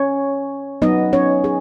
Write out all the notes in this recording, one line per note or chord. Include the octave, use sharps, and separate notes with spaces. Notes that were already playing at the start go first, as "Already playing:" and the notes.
Already playing: C#4 C#5
F#3 B3 D#4 D#5
C#4 C#5
G#4